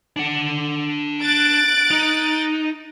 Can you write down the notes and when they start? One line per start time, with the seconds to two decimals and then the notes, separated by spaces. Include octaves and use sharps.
0.16 D4 F#5
1.21 F#6 A6 D7
1.91 D#4